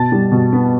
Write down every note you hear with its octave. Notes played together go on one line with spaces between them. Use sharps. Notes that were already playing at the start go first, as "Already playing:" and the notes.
Already playing: B2 A5 A6
G3
B2
B3